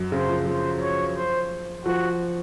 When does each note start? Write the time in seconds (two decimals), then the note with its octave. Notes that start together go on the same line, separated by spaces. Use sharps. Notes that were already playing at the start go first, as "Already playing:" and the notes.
Already playing: F#2
0.12 C#3 C5
0.29 F3
0.46 F3 C5
0.82 C#5
1.16 C5
1.85 F3 F#4